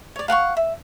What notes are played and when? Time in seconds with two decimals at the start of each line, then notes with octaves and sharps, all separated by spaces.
0.16 C#5 D5
0.28 F5 F#5 A5 C#6
0.57 E5